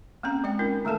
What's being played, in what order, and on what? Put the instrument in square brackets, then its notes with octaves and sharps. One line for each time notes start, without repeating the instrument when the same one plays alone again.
[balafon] A#3 C4 C#4 A#5
G#3 D5 G5
C#4 D#4 F4 A#4
D#3 A3 A#3 A4 A5